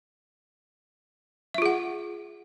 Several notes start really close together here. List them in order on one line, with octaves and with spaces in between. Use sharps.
E5 F4 G#4 F#5